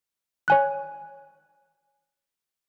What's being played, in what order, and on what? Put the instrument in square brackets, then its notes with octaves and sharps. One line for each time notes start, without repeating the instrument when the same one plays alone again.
[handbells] C#5 G#5 F#6